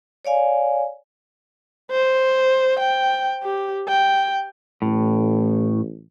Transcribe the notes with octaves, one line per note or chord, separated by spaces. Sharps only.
C#5 D5 F5 G#5
C5
G5
G4
G5
A1 A2